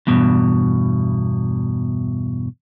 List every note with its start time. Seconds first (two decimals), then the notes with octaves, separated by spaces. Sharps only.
0.07 E2 G2 B2